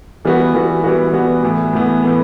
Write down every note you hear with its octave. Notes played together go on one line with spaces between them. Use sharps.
E3 G3 B3 F#4
E3 G3 B3 F#4
E3 G3 B3 F#4
E3 G3 B3 F#4
A2 E3 B3
A2 E3 B3
A2 E3 B3